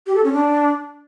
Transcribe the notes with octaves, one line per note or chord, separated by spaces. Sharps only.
G4
A4
C#4
D4